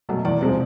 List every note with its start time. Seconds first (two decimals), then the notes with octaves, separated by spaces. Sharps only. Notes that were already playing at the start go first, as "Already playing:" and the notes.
0.09 B2 F#3 A3
0.25 E2 D5
0.41 C3 F3 G#3 C4